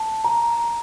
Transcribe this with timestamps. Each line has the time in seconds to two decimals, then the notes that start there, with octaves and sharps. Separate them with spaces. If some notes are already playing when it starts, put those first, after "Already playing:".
Already playing: A5
0.24 A#5